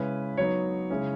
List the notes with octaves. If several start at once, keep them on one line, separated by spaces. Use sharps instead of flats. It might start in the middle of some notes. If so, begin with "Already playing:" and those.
Already playing: C#3 G#3 C#4 E4 B4
F#3 B3 D#4 C#5
C#3 G#3 C#4 E4